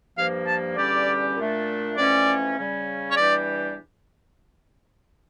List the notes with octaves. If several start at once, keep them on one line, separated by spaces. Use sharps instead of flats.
G2 F3 A#3 F5
A5
E2 D3 G3 C#4 G4 D5
A#2 A3 D4
F2 E3 A3 C#4 D5
C#3 G3 C#4
C#5
E2 E3 G3 D4 G4 D5